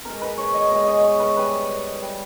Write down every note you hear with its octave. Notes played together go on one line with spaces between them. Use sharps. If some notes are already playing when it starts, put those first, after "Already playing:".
B2 G#3 A#4
B4
C#5
D#5
B2 G#3 D#5
D#5
C#5
B4
G2 G3 B4
G3